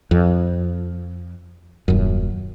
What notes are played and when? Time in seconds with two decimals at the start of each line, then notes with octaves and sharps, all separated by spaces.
0.11 F2
1.88 D#1 F#2